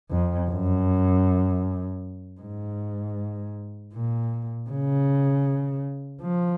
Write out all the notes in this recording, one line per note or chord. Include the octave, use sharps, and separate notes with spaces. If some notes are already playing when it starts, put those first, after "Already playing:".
F2
F#2
G#2
A#2
C#3
F3